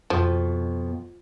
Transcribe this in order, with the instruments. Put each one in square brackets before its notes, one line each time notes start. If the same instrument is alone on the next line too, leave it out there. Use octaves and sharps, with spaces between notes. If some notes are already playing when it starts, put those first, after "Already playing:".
[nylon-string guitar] F2 B2 [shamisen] F3